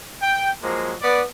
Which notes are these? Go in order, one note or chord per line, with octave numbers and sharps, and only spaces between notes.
G5
F3 F#3 G#3 A#3
B3 B4 D5